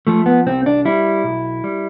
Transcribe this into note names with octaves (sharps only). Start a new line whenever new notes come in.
F3 A3
B3
C2 C4
D4
G3 E4
B1
G3